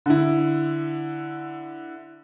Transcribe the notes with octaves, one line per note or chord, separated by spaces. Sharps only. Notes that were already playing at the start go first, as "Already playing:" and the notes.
D3 E4